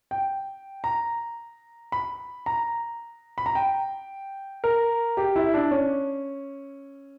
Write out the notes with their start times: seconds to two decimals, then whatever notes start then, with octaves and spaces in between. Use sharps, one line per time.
0.11 G5
0.84 A#5
1.92 B5
2.46 A#5
3.38 B5
3.46 A#5
3.55 G5
4.64 A#4
5.17 G4
5.36 E4
5.54 D4
5.71 C#4